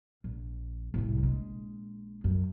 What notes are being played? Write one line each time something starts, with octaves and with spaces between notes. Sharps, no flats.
A#1
C2 A2
A#1 G#3
F#2